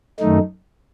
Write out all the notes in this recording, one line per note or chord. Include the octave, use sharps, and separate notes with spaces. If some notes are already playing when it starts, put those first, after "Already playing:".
F#2 D#3 A3 D#4